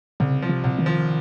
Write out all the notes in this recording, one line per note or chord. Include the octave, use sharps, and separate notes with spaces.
C2 C#3
F3
C3
C2
D#3
F3